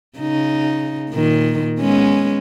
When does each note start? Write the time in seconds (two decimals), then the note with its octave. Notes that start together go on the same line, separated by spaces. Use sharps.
0.18 C#3 D#4
1.10 A#2 D#3
1.80 G#3 B3 C#4